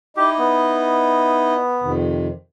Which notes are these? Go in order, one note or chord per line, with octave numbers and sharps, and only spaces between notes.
D#4 E4 G4 D#5
B3
F2 C3 D#3